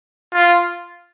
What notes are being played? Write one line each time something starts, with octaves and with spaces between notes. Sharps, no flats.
F4